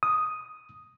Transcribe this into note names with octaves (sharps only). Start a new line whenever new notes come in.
D#6